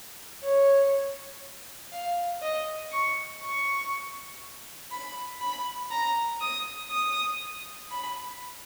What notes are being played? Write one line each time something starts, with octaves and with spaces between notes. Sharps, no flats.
C#5
F5
D#5
C#6
C#6
B5
B5
A#5
D#6
D#6
B5